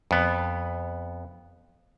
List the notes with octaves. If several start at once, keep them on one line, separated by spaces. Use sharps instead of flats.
F2 B3